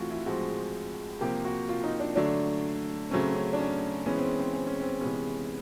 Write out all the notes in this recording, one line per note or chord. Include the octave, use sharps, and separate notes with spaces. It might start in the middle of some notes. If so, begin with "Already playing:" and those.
Already playing: E3 A3 C4 F4 F#4
E4
A2 F3 G#3 C4 F#4
C3 F3 A#3 G4
F#4
F4
D#4
D4
D3 F#3 A3 D4
C#3 F#3 A3 C4 C#4
C#4
D4
C#4
E3 G#3 B3 C#4
C4
C4
C4
C#4
C4
C3 E3 G#3 B3 C#4